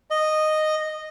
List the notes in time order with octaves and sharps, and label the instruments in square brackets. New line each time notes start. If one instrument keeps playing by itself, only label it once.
[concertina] D#5